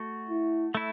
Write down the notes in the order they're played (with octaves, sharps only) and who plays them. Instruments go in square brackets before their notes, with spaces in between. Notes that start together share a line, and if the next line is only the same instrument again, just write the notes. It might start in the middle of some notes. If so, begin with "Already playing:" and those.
Already playing: [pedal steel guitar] A3 F#4
[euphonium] E4
[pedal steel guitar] A3 E4